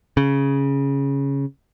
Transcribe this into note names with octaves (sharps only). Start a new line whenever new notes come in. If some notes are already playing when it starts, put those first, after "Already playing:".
C#3